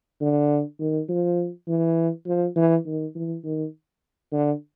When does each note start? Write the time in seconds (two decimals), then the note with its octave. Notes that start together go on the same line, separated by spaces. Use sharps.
0.21 D3
0.80 D#3
1.09 F3
1.68 E3
2.26 F3
2.56 E3
2.86 D#3
3.15 E3
3.44 D#3
4.32 D3